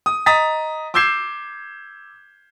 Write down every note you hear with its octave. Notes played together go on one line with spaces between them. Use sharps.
D#6
D#5 A#5 D#6 A6 B6
D6 E6 G6 G#6 C7 E7